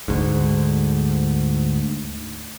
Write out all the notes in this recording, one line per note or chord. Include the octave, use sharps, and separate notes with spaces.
D2 G#2